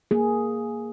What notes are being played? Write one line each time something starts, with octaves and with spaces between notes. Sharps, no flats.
A#3 G#4